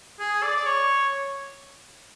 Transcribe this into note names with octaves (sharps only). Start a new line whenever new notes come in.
G#4
D5
D5
C#5